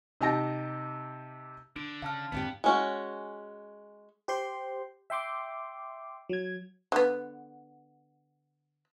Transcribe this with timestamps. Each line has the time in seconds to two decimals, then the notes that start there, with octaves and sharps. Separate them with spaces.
0.21 C3 D#4 G4 A5 A#6
1.76 D3 D4 D7
2.02 C#3 F5 A5 F6
2.32 F2 G#2 D3 B3 C4 D4 G4
2.64 G#3 C#4 F#4
4.28 G4 C5 G5 C6
5.10 E5 G5 C6 D6
6.29 F#3 G#6
6.92 D3 B3